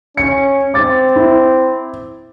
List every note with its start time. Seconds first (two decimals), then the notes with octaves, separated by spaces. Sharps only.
0.17 C#4 C#7
0.74 C4 D6 A6
1.16 E4